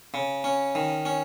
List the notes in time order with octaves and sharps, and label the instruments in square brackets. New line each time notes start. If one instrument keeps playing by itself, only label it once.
[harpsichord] C#3
C#4
D#3
C#4